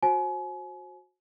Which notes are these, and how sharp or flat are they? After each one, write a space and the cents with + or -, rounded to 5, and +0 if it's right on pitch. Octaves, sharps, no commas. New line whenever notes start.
F#4 -20 C5 +30 G#5 +35